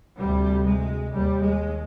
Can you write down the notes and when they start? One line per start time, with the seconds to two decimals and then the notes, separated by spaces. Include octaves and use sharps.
0.18 D2 C3 G3
0.65 G#3
1.11 D#2 G3
1.42 G#3